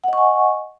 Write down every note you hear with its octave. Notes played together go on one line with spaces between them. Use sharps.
D#5 F#5 G#5 C#6